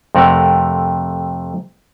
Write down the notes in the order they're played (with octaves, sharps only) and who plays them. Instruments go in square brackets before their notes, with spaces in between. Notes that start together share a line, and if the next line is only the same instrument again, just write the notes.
[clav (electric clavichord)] F2 C3 A3 A#4 F#5